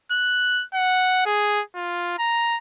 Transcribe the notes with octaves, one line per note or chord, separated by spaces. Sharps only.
F#6
F#5
G#4
F4
A#5